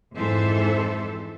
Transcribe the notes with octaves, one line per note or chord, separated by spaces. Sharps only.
F2 G#2 E3 A4 C5 E5